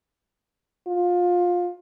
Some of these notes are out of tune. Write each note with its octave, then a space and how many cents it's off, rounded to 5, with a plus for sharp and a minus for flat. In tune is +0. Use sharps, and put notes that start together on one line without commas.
F4 +20